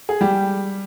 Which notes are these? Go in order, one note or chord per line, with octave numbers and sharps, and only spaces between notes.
G#4
G3 G4